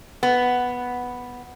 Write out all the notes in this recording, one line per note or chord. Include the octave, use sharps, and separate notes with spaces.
B3